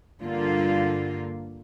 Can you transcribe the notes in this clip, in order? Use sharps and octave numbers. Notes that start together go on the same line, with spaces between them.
G2 D3 A#3 F4